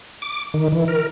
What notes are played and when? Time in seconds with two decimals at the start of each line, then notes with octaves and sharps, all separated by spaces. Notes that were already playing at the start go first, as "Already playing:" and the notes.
0.22 D6
0.54 D#3
0.72 E3
0.88 A#4